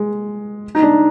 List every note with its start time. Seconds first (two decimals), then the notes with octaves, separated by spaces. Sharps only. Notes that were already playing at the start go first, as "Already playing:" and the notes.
Already playing: G#3
0.75 D#4
0.82 D4